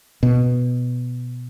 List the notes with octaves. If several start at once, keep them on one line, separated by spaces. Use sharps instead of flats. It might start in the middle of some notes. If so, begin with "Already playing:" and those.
B2